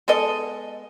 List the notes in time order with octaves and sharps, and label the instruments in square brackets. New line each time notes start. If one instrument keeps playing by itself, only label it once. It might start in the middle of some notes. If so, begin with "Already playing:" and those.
[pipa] G#3 B3 A4 D#5